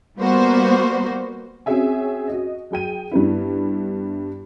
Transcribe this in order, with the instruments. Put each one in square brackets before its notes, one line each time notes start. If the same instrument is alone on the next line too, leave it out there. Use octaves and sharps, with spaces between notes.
[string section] G3 A#3 B3 F#4 C5
[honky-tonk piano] C4 C#4 F#4 G#4 E5 G#5
F#4 D#5
F#3 G#4 G5 D#7
G2 B3 E4